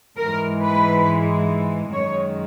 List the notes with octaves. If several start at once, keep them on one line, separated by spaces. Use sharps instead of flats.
G#2 E3 G#3 A#4
B4
F#2 D#3 G#3 C#5